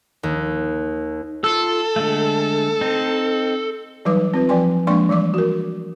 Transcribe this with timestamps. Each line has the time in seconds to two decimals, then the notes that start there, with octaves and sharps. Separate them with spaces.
0.23 D#2
1.44 F4 A4 E6
1.96 D3 G#3 A3
2.81 C4 D#4
4.05 E3 F#3 G3 D#4 B4 D6
4.34 C4 F4 B4
4.49 F3 B4 G5 G#5 C6
4.87 F3 G#3 A#3 D4 C6 C#6
5.09 E3 G3 D5 D6
5.34 F#4 A#4